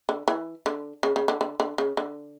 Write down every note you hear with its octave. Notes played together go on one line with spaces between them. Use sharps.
D3
E3
D3
C#3
C#3
D3
D3
D3
C#3
D3